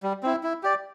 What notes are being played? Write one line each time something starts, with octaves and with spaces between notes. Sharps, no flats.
G3
C4 E4
E4
G4 D5